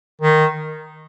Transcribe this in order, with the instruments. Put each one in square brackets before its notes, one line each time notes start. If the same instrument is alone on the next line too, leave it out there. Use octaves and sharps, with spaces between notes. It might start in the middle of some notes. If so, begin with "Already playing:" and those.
[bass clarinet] D#3